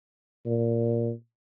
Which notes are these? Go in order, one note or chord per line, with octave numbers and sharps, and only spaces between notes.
A#2